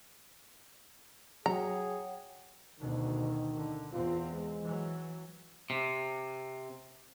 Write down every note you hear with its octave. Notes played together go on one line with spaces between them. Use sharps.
F#3 G#4 C#5 F#5 G5 A#5
D2 B2 D#3
D3
E2 C4 F4
G#3
E3 F#3
C3